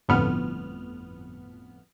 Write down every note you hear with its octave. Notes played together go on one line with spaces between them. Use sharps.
G1 F2 A2 B3 F6